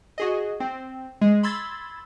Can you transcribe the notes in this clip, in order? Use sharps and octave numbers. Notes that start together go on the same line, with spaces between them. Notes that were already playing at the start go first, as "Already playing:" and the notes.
F#4 G#4 D#5
C4
G#3
B5 C6 E6 G#6 A6